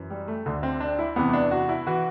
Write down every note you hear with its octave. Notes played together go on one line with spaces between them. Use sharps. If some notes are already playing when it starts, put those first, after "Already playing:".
Already playing: F#2 E3
G3
A3
D2 D3
C4
D4
E4
E2 C3 E3 B3
D4
F#4
E4
E3 F#4